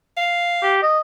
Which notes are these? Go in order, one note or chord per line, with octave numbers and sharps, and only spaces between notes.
F5
G4
D#5